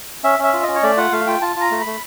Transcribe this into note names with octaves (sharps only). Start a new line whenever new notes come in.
C#4 E5
C#4 E5
F4
C#4 D#5
C#5
A3 D5
F4 F#5
A3 F5
F4 G5
F4 A5
F4 A#5
A3
A3 B5